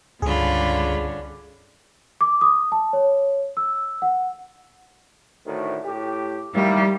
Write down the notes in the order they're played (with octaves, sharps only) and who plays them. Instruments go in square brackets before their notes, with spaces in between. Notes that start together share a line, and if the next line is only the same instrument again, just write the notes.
[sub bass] C#2 [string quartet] G2 F4 B5 [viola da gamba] D3 C#4 D4 [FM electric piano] G#4
[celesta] D6
D#6
A5
C#5
E6
F#5
[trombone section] D2 A2 D#3
A2 G4
[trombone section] D#3 A#3 E4 [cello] G3